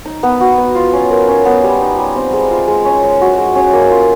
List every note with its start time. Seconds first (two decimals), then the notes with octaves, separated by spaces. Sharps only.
0.05 D#4
0.23 B3
0.40 F#4
0.58 B3
0.75 F4
0.93 C#4
1.11 A#4
1.28 C#4
1.45 B3
1.64 G3
1.81 D#4
1.98 G3
2.16 C4
2.33 G#3
2.50 F4
2.68 G#3
2.85 C#4
3.03 G#3
3.21 F#4
3.38 G#3
3.56 C#4
3.73 A#3
3.90 F4